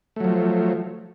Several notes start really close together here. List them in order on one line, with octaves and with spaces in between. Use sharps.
A3 F#3 F3